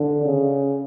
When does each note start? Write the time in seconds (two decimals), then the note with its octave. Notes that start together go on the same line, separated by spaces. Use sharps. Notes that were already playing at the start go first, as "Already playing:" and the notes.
Already playing: D3
0.25 C#3